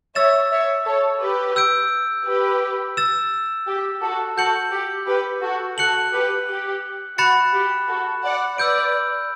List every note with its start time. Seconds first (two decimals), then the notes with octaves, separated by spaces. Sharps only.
0.15 C#5 E5 E6 A6 E7
0.51 C#5 E5
0.86 A4 C#5
1.21 G4 B4
1.56 E6 G6 D7
2.26 G4 B4
2.97 E6 A6 E7
3.67 G4
4.02 F#4 A4
4.37 F#4 A4 G6 C#7 F#7
4.72 G4
5.07 G4 B4
5.42 F#4 A4
5.77 F#4 A4 F#6 C#7 F#7
6.13 G4 B4
6.48 G4
7.18 F#4 B5 F#6 A6 C#7 E7
7.54 G4
7.88 F#4 A4
8.24 D5 F#5
8.58 B4 D5 E6 G6 D7